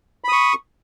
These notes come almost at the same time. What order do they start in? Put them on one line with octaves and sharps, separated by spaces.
B5 D#6 C#6